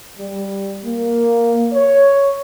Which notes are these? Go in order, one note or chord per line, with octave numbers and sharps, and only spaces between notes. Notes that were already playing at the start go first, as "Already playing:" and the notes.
G3
A#3
C#5